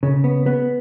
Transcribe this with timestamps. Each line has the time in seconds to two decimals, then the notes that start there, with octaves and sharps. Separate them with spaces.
0.03 C#3
0.24 B3
0.46 B3